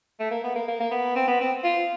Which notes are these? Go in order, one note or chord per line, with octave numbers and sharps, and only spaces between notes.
A3
A#3
B3
A#3
A#3
A#3
B3
C4
B3
C4
F4